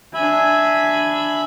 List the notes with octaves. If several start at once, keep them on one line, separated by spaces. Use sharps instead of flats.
D4 E5 G#5 B5